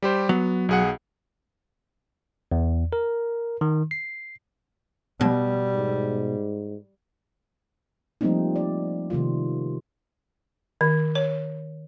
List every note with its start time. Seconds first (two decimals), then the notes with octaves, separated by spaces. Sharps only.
0.02 G3 G4 C5
0.29 F#3 B3
0.69 B1 G#4 F#5
2.52 E2
2.93 A#4
3.61 D#3
3.91 C7
5.21 B2 G3
5.74 G#2
8.21 F3 G3 A3 A#3 C4 D#4
8.56 D5
9.10 C3 D#3 A3 F4
10.81 D#3
11.15 C#5